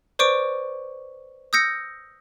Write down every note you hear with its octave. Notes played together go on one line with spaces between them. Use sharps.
B4 C5 D5 C#6 D6 D7
D#6 E6 G6 A#6 C#7